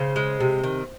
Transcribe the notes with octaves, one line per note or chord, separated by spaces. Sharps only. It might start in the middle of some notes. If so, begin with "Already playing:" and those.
Already playing: C#3 C5
G#3
C3
D#3